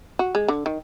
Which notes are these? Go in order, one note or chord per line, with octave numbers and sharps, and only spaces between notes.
F#4
G#3
D3
D#3